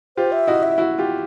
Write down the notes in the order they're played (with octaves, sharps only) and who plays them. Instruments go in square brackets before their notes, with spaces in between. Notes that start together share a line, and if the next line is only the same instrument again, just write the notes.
[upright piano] F4 G4 [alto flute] C5
[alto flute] E5
[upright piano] E4 F#4 [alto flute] D#5
[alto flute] E5
[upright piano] E4 F#4
F4 G4